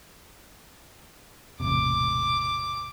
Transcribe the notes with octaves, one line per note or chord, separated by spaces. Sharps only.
E1 A1 C3 D6